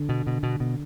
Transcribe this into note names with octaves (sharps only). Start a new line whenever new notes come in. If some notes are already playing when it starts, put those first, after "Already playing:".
Already playing: D3
B2
B2
B2
B2